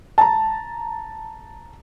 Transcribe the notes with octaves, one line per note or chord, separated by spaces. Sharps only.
A5 A#5